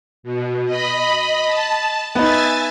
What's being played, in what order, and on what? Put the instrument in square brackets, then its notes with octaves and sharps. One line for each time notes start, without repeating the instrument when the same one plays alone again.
[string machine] B2
D#5 B5
A5
[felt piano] B3 D#4 [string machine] E5 G#5 A6